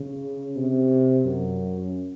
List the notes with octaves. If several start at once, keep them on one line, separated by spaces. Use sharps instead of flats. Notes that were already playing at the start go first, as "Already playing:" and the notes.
Already playing: C#3
C3
F#2